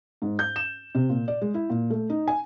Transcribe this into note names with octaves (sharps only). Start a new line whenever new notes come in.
G#2
G6
E7
C3
A#2
D5
G#3
E4
A#2
A3
D#4
G#5